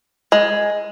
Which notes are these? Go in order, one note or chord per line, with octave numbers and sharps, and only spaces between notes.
G#3